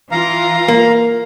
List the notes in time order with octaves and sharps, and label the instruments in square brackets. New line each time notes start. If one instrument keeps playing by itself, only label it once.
[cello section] E3 F4 [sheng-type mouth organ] F5 A#5
[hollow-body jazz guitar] A#3